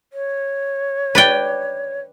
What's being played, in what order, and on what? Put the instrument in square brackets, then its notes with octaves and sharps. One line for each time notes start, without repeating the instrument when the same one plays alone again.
[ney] C#5
[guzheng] B4 D5 G5